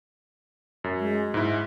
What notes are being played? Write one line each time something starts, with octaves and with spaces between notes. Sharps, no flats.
F#2
G#3
G#2 E4